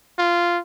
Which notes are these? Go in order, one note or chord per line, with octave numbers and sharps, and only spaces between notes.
F4